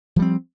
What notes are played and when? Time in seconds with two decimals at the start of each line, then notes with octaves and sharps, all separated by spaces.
0.16 F3
0.19 G3
0.22 C4